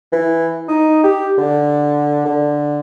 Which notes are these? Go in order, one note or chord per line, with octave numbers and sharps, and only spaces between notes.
E3
D#4
G4
D3
D3